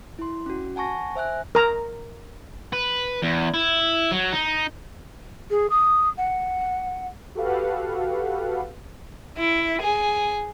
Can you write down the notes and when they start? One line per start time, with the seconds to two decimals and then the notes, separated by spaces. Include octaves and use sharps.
0.19 E4 C6
0.46 C#4 F#4
0.76 F#5 G#5 A5 C#6 A#6
1.16 C5 E5 G#5 F#6
1.55 A#4 A#5
2.73 B4
3.22 E2
3.54 E4
4.11 F#3
4.32 D#4
5.50 G#4
5.70 D#6
6.17 F#5
7.35 F#4 G4 A4 B4 F5 F#5
9.37 E4
9.81 G#4